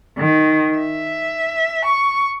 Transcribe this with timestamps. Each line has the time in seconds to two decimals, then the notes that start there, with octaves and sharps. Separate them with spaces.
0.19 D#3
0.79 E5
1.88 C#6